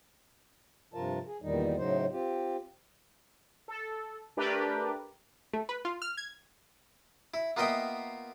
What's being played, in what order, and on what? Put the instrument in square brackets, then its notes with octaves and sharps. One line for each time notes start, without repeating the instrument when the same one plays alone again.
[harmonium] G2 C3 F3 F4 A#4 A5
G#4
E2 A#2 D#3 G3 D#4
A2 C#3 F#3 D#4 C5
C4 F4 G4
[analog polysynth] A4
A3 D4 G4 A#4 B4 D5
[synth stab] A3
B4
F4
F6
G#6
[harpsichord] E4
A#3 B3 F4 D#5 E5 G5